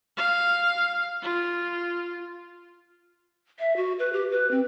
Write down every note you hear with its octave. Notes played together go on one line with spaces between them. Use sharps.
F5
F4
E5
F#4
B4
G4
B4
C4